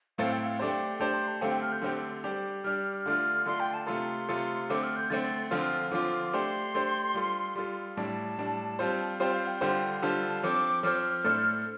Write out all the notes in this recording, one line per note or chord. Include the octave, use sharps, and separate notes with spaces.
A2 A3 C4 A4 F5
G5
F5
A3 D4 G4 C5 G5
A3 D4 G4 C5 A5
C6
A5
D3 A3 C4 G4 F5
G5
F6
G6
D3 A3 C4 G4
G3 D4 G4
G3 D4 G4 F6
D3 A3 D4 F4 F6
D3 A3 D4 F4 C6
G5
A5
C3 A3 F4 A4 C6
C3 A3 F4 A4
D3 A3 C4 D6
F6
G6
D3 A3 C4 A6
D3 F3 C4 F4 F6
D3 F3 C4 F4 D6
A3 D4 G4 C5 C6
A3 D4 G4 C5
G3 F4 A4
G3 F4 A4
A2 G3 D4 A5
A2 G3 D4
G3 C4 F4 C5
G3 C4 F4 C5 G5
F5
G5
D3 G3 F4 C5
D3 G3 F4 C5 A5
F3 C4 A4 C5 D6
F3 C4 A4 C5 F6
A2 A3 D4 A4 C5